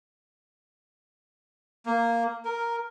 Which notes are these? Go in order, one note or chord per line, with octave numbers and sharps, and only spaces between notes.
A#3
A#4